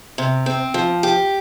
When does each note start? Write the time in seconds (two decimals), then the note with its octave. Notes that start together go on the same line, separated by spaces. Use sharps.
0.18 C3
0.46 C4
0.74 F3
1.03 G4